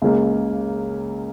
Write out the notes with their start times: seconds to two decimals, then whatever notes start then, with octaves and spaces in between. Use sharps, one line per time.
0.02 C#2 C#3 A#3